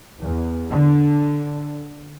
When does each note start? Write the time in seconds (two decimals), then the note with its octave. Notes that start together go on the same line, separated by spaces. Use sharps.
0.21 E2
0.71 D3